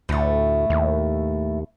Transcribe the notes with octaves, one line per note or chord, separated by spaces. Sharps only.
D2 A2 A3
D#2